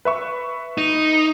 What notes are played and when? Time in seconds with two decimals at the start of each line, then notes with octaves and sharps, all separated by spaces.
0.05 B4 E5 C#6
0.78 D#4